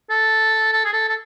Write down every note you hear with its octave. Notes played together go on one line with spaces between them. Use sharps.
A4
A4
G#4
A4
A4